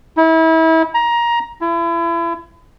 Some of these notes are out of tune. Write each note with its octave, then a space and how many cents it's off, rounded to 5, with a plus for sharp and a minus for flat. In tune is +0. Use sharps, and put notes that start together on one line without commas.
E4 -30
A#5 +20
E4 +35